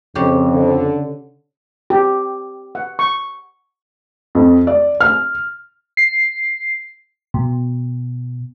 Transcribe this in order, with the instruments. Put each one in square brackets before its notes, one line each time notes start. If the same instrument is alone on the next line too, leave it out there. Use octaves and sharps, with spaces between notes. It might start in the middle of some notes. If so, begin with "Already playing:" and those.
[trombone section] F2 [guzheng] C#3 G4
[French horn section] D3
[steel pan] G4
F#5
C#6
[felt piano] F2
D5
F6
[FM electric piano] C7
B2